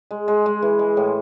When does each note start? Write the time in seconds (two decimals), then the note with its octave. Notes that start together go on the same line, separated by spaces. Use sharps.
0.11 G#3
0.28 G#3
0.46 G#3
0.62 E3
0.79 G#3
0.97 A2